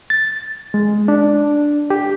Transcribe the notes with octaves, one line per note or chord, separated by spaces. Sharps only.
A6
G#3
D4
G4